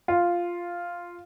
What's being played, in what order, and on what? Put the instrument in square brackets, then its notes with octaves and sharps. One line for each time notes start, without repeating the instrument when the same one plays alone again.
[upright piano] F4